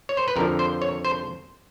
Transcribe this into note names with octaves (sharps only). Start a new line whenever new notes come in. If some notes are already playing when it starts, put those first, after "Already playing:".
C#5
C5
B4
F2 D3 F3 A#4
C5
C#5
C5